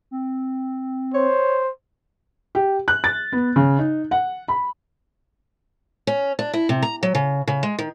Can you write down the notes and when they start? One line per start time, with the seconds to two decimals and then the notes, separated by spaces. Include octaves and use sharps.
0.11 C4
1.14 C5 C#5
2.55 G4
2.88 F#6
3.04 A6
3.32 B3
3.56 C#3
3.79 D#4
4.11 F#5
4.48 B5
6.07 C#4
6.39 D4
6.53 E4
6.69 C3
6.82 A#5
7.03 F#3
7.15 C#3
7.47 C#3
7.63 G#3
7.79 D#3